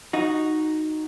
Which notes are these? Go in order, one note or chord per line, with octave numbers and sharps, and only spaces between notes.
D#4 F#4